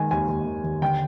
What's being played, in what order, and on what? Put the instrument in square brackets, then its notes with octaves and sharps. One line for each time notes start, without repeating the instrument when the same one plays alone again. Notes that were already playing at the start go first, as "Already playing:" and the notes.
Already playing: [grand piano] D#3 G#3 G#5
D#2 G#5
D#2
D#3
D#2
D3 G5